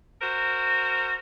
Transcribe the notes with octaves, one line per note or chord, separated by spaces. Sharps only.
F#4 A#4 C5